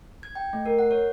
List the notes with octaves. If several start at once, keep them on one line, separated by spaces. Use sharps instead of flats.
G#6
G5
A3
A#4
F#5
C#5